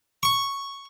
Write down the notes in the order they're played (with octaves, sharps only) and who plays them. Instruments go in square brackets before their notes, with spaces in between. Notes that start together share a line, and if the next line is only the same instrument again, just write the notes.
[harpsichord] C#6